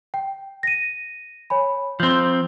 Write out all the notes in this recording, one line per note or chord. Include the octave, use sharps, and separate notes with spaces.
G5
A#6 D#7
C#5 G#5 B5
F3 C4 C6 G6